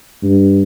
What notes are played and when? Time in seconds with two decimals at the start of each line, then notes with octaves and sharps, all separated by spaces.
0.23 G2